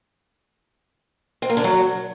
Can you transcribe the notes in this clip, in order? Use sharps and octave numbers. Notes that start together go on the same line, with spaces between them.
C4
A#3
D3
F#3